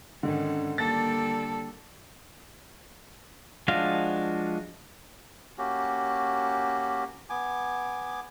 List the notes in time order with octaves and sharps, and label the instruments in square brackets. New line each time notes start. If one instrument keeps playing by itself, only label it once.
[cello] G#2 C#4 [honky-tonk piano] D3 [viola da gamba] D#3
[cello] D3 A4 [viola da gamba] G3 A#3 [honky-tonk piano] A6
[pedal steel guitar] F3 G#3 D4 F#4 F5
[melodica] A#3 C#4 F#4 G4
B3 G#5 D6